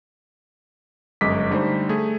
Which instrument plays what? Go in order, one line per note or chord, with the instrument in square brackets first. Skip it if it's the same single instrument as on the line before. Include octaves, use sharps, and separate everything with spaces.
[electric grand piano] G1 F#2 G#3 D#5 D6 B6
D3 G3 A3 D#4 C5
A3 G#4